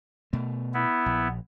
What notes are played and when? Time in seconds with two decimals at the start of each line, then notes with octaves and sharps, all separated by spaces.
0.33 B2 A3
0.74 B3 E4
1.06 A#1